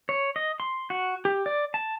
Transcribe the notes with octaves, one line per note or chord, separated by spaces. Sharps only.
C#5
D#5
C6
F#4
G4
D5
A5